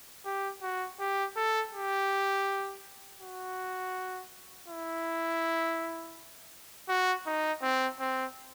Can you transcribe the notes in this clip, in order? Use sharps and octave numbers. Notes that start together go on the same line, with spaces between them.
G4
F#4
G4
A4
G4
F#4
E4
F#4
D#4
C4
C4